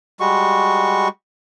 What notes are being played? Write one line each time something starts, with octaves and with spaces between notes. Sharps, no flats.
G3 G#3 F#4 C#6